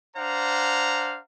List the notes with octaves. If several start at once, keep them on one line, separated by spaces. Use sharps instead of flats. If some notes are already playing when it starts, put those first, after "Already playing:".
D4 C5 F5 F#5 A#5